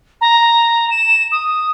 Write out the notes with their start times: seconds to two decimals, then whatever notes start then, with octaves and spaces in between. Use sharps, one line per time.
0.21 A#5
0.90 E7
1.32 D#6